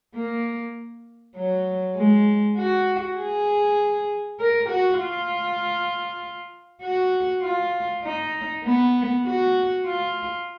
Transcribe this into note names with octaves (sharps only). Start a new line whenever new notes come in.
A#3
F#3
G#3
F#4
G#4
A#4
F#4
F4
F#4
F4
D#4
B3
F#4
F4